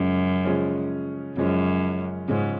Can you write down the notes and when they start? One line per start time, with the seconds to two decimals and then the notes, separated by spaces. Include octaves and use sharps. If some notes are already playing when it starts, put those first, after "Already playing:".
Already playing: F#2 C#3 F3 G#3 C#4
0.45 C#3 F3 G#3 C#4
1.37 F#2 C#3 F3 G#3 C#4
2.28 G#2 C#3 F3 G#3 C#4